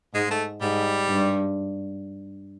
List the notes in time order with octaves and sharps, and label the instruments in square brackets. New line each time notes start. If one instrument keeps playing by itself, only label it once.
[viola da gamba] G#2 [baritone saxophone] G#3
[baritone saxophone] A3
[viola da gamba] G#2 [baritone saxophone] G3
[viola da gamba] G2